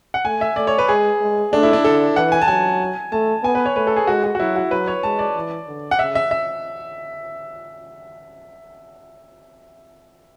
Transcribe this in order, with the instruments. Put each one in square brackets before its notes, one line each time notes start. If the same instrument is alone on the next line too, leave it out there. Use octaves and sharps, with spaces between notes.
[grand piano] F#5
[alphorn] A3 [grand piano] G#5
[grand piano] E5
[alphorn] A3 [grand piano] D5
[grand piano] C#5
B4
[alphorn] G#3 [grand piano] G#4
[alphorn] G#3
[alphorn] A3 [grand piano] D4
[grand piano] E4
D4
[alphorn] D3 [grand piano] A4
[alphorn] E3 [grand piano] F#5
[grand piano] G#5
A5
[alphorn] F#3 [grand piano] G#5
[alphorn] A3 [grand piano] A5
[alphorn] B3 [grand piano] G#5
[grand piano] B4
C#5
[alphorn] A3 [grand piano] B4
[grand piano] A4
G#4
[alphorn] G#3 [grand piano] F#4
[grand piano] F#4
F#4
[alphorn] F#3 [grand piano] E4
[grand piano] F#4
[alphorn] F#3 [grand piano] B4
[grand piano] C#5
[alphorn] G#3 [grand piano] A5
[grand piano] D5
[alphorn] E3
D3
[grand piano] F#5
[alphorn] C#3 [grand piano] E5
[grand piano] E5
E5